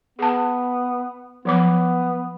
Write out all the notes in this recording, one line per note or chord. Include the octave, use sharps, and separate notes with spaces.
B3 G#4 A5
F3 F#3 B3 D6